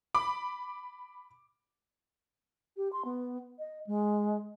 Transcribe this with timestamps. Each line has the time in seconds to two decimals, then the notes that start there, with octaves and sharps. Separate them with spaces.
0.15 B5 D6
2.77 G4
2.93 C6
3.05 B3
3.59 D#5
3.87 G#3